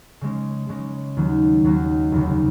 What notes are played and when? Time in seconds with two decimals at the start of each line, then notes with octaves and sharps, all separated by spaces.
0.21 C#3 G#3 C#4
0.69 C#3 G#3 C#4
1.17 D#2 D#3 F#3 A#3
1.64 D#2 D#3 F#3 A#3
2.12 F1 D#2 C#3